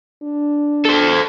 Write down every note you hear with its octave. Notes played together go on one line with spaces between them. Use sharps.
D4
A4 C5